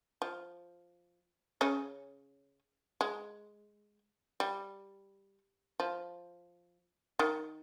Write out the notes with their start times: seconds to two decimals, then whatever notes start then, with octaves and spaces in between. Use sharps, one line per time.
0.22 F3
1.61 C#3 C#4
3.01 G#3
4.40 G3
5.80 F3
7.19 D#3